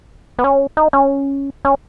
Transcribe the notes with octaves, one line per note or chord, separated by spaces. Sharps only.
B3
C#4
D#4
C#4
C#4